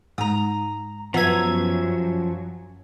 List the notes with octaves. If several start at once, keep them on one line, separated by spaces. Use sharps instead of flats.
G#2 A#5 D#6
F#2 F3 F#3 B3 E5 G#5 A#5 G#6